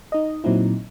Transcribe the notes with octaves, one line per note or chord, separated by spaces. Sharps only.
D#4 D#5
A#2 F#3 C4 D#4 E4